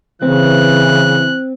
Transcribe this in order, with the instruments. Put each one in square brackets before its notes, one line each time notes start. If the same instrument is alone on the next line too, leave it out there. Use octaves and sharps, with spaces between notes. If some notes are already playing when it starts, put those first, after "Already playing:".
[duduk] C#3 [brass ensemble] E3 [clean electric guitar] C4 [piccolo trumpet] F#6